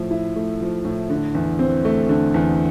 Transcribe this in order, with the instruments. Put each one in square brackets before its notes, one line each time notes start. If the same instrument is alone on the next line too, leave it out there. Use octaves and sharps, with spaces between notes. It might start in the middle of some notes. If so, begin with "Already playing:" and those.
Already playing: [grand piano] A2 F3
E4
A3
F3
A2
D3
E2
C4
A3
D3
E2